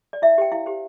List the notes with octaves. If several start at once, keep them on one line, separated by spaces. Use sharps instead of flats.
D5
E4 E5
G4 C5 G5
E4 F5
G4 C5